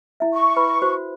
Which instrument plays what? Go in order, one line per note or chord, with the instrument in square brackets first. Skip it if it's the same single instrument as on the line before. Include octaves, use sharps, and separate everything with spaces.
[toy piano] E4 E5
[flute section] C#6
[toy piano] E4 B4 B5
F#4 C5